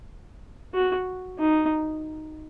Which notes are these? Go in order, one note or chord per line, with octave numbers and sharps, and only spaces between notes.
F#4
D#4